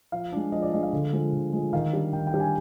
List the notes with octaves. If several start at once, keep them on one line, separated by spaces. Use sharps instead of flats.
F3 F5
G#3 D4
F3 D#5
D5
G#3 D4 D#5
F5
D3
F3 G#3
D3
F3 G#3
D#3 F5
G3 D4
D#3 G5
G5
G3 D4
G#5